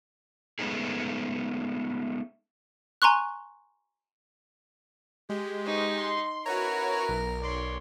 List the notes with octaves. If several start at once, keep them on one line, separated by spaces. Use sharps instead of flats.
G#3 A3 B3 C#4 D#4 G#4
G#5 A#5 C6 C#6 F#6
G#3 G4
D#4 B4 C5 C#6
C6
C#4 E4 F#4 A#4 B4 C#5 A#5
B1
C#5 D5 C6